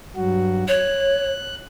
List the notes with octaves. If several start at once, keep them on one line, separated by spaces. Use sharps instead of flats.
G2 F#3 F#4
C#5 F#6